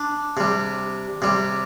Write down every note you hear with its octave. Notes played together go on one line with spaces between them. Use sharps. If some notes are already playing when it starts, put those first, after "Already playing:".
Already playing: D4
C3 G3
C3 G3